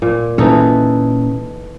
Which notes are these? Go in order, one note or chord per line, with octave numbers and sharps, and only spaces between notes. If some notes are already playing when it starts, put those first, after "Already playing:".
A#2
A#2 E3 A#3 C#4 D#4 A4